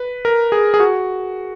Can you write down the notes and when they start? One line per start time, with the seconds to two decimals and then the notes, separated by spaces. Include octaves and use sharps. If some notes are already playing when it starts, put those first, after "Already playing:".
Already playing: B4
0.25 A#4
0.52 G#4
0.74 G#4
0.80 F#4